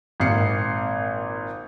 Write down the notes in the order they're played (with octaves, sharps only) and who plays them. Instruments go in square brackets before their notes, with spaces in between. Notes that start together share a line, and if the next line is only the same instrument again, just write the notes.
[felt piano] G#1 A#2 C7 C#7